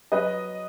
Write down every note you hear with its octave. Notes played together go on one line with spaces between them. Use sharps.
F#3 B4 D#5